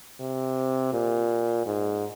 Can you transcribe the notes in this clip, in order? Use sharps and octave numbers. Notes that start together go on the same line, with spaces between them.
C3
A#2
G#2